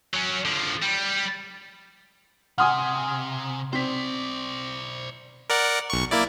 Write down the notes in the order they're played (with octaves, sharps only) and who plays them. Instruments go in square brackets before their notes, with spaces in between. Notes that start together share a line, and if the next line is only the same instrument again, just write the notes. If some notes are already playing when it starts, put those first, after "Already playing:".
[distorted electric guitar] F#3 C#4
D3 F3
G3
[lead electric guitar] C3 [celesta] F#5 C6 [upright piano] G#5 D#6 F6
[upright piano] C4 B6 [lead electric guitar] C5 D5
[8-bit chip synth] A#4 D5 F#5
B1 C#6
A#3 E4 D5